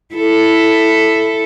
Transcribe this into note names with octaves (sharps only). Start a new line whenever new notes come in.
E4 A4